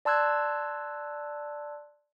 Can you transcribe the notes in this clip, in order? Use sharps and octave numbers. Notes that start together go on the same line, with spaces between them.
D5 A5 C6 E6 F#6 G#6